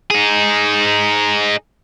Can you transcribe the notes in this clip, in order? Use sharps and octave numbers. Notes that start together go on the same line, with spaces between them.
D#4 G#4